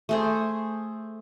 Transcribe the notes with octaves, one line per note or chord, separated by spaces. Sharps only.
A3 G#4 C5